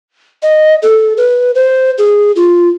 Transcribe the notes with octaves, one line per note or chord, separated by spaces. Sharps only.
D#5
A4
B4
C5
G#4
F4